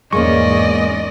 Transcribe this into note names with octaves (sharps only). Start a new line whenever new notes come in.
E2 G#2 G#3 A#3 C#4 D5 D#5 C#6